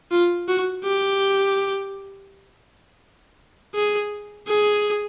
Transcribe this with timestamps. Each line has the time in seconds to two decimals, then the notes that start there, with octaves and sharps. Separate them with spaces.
0.11 F4
0.49 F#4
0.84 G4
3.75 G#4
4.48 G#4